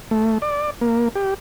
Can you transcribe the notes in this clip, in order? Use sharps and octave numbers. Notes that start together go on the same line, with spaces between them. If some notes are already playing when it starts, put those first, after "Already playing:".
A3
D5
A#3
G4